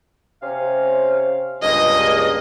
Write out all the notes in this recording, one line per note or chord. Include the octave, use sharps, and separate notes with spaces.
C3 C#4 F5
C#2 G2 A#3 D#5